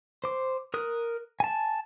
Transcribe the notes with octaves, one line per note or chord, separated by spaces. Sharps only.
C5 D6
A#4 D#6 F#6
G#5 A5